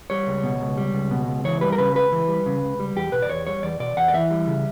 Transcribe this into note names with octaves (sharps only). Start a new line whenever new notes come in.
G3 C#5
C#2
B2
C#2
G3
C#2
B2
C#2
E3 C#5
G3 B4
A#4
C#3 B4
C#2 B4
E3
G3
C#3
C#2
G3
E2 G4
B2 B4
D5
E2 C#5
G3 C#5
E2 D5
B2 D5
E2 F#5
D5
E3 E5
G3
C#3